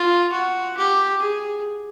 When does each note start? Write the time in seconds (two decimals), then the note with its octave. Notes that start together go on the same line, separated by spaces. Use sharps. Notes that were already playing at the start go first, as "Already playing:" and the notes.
Already playing: F4
0.33 F#4
0.77 G4
1.21 G#4